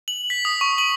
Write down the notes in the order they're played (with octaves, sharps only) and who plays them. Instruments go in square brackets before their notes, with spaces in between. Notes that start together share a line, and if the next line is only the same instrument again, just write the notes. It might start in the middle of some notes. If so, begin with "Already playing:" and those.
[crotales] F#7
B6
D#6
C#6
F#7